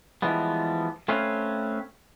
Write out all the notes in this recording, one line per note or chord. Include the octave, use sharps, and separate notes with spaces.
E3 F3 G3 G#3 B3
A3 C4 C#4 B4 C#5 F5